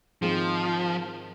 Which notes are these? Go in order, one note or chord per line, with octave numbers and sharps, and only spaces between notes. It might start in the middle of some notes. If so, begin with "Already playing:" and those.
G#2 D#3 F3 C4 G#4